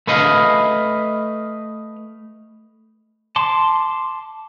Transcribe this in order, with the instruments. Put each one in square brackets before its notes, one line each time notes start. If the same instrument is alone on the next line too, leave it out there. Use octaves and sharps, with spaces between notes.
[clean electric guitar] A3 B4 D#5 F5
[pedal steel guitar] A5 C6 D6